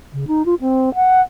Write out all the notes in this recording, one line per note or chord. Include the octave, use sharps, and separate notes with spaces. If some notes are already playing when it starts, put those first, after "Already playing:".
C#3
D#4
F4
C4
F#5